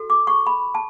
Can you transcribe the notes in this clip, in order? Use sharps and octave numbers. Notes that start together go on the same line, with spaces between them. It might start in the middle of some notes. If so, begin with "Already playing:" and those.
Already playing: F#4 A4
D6
C#6
B5
A5